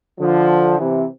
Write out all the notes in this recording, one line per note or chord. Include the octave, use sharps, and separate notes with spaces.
D3 F3
C3 E3